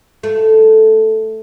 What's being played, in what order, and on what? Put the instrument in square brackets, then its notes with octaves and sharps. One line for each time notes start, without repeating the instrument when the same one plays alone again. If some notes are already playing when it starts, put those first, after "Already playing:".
[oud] A3